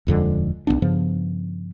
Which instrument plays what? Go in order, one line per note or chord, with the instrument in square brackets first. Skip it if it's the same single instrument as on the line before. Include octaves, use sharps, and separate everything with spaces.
[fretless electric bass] D#1 F2 D3 G#3
C2 G#2 B3 D4
G2 C#3 F3 B3